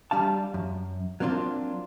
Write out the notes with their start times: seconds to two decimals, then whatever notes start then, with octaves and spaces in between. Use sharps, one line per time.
0.11 G3 D4 F5 A5
0.54 F#2
1.20 F#3 A#3 C4 D4 F4